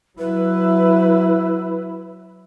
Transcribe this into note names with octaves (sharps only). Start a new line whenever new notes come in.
F#3 E4 B4